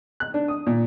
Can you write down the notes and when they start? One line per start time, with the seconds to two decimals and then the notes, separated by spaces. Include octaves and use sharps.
0.20 F#6
0.34 D4
0.48 D#6
0.67 A#2